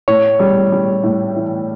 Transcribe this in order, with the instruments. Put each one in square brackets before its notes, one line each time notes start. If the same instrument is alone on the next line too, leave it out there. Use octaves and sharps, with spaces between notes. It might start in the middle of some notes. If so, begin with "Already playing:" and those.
[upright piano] A2 [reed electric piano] C#5
[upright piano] G3
G3
A2
E3